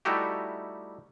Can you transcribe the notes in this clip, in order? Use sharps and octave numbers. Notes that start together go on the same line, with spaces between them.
G3 A3 D#4 E4 F#4 G4